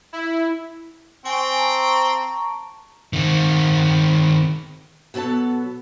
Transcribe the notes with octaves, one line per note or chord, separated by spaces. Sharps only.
E4
C4 G5 G#5 C#6
A5 A#5 C#6
D#3 C4
B2 F#3 B3 A4 A5